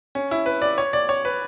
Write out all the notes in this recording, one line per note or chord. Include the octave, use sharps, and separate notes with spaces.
C#4
E4
B4
D5
C#5
D5
C#5
B4